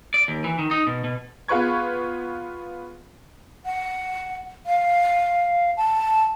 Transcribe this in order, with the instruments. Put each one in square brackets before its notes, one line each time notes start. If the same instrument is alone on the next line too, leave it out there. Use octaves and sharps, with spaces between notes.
[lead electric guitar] D5
D#2
E3
D#3
D#4
B2
B2
[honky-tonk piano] B3 F4 G#4 B4 C#6 G#6
[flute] F#5
F5
A5